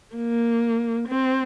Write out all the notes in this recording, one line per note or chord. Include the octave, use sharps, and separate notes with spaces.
A#3
C4